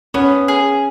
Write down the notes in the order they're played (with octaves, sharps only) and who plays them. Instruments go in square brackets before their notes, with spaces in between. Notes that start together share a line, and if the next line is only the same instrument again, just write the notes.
[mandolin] B3 [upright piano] C#4
[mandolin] G#4